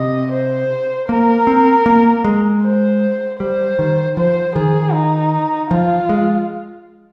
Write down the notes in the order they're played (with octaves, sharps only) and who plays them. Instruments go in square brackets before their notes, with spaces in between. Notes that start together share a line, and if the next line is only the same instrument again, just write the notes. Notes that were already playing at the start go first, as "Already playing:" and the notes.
Already playing: [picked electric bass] C3 [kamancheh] D#5
[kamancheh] C5
[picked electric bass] A#3 [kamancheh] A#4
[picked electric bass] C4
A#3
G#3
[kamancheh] C5
[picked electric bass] G3 [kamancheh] C5
[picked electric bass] D#3
[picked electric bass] F3 [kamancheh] C5
[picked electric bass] D#3 [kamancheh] G#4
[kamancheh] D#4
[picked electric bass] F3 [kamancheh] F4
[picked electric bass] G#3